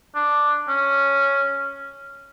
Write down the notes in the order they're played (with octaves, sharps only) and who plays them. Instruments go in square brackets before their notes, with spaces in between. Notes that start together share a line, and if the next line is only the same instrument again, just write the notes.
[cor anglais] D4
C#4